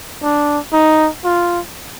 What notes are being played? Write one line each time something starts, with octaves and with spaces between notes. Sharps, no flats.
D4
D#4
F4